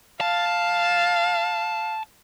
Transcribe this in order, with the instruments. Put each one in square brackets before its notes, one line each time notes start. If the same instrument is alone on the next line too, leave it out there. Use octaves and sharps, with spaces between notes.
[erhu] F5 [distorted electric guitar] A5